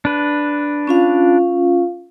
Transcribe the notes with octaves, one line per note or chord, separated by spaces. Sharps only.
D4 B4
C#4 F4 F5